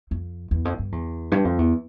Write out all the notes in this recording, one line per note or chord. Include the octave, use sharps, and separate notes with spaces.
F2
E2
F2
G2
E2
G2
F2
E2